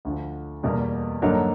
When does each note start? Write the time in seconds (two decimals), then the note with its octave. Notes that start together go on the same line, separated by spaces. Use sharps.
0.05 D2 D3 F3
0.63 E2 B2 G3 A#3
1.22 G2 D3 F#3 A#3 D#4